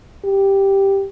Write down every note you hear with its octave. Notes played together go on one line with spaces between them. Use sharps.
G4